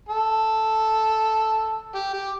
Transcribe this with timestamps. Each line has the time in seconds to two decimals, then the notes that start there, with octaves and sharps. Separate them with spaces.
0.09 A4
1.95 G4
2.14 G4